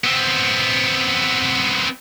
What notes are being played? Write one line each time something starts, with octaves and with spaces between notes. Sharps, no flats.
B3 C4